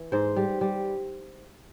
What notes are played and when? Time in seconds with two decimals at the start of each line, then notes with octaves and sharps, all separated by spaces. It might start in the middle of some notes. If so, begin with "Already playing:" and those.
Already playing: E3
0.12 G#2 C5
0.36 G3
0.61 G3